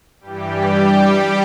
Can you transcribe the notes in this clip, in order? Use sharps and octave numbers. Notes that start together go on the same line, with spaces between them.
G2 E3 G3 G4